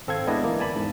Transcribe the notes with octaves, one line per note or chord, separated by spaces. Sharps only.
G#1 C4 A4 F5 G#6
G#3 B3 D4 E4 D5 D#5
G1 E3 A#3
D5 G#5 A5 B5
E2 G#2